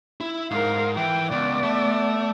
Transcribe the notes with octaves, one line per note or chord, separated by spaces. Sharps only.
E4
G#2 A#4 F5
E3 G5
C#2 B3 D5
A3